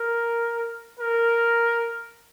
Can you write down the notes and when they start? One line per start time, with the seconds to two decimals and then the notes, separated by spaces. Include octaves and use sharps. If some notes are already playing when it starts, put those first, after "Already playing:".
Already playing: A#4
0.99 A#4